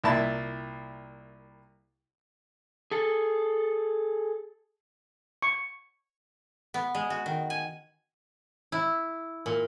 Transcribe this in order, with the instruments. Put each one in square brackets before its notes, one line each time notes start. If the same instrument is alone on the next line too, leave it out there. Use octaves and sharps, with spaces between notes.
[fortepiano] C2 A#2 E4 A5 B5
[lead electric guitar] G#4 A4
[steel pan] C#6
[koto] B3
G#3
F#4
D#3
G#5
E4
A#2